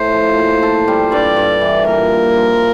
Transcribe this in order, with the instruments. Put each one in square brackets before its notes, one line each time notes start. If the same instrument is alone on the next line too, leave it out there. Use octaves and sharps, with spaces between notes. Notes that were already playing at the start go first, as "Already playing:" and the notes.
Already playing: [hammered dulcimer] A2 [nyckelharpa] C5
[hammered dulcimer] F3
A#2
A4
G3
[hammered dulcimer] G2 [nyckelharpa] D5
[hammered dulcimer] G2
E3
[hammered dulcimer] A#2 [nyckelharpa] A#4
[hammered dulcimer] A#2
F3